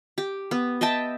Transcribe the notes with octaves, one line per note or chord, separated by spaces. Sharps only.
G4
B3
D#5 E5 G5 A5